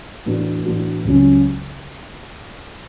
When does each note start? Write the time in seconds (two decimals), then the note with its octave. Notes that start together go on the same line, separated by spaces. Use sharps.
0.26 A2 E3 B3 D4 F#4
0.65 A2 E3 B3 D4 F#4
1.05 C#2 C#3 F#3 C#4